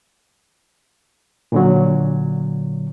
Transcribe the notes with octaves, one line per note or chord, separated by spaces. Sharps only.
A#2 D3 F#3